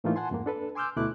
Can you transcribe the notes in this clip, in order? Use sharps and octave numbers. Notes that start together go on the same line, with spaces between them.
A2 E3 A3 A#3 D#4 F4
F#5 G#5 A5 C6
F2 G#2 A#3
D4 A4 B4
G#5 C6 D6 E6 F6 G6
D2 B2 A3 E4 D6 F#6